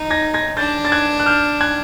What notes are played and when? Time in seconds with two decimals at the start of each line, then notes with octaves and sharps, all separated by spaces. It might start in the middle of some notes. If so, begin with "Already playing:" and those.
Already playing: D#4
0.11 G#6 A#6
0.34 G#6 A#6
0.57 D4 G6 A6
0.85 A6
0.92 F#6 G#6
1.20 F#6
1.26 F6 G6
1.61 F#6 G#6